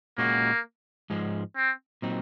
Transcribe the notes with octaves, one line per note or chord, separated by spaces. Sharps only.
A#2 G#3 A#3 C#4 F#4
G#2 F3 G#3
C4
A#2 F#3 C4 D#4